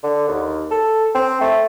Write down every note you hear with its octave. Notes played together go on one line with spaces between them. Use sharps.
D3
D#2
A4
C4
A3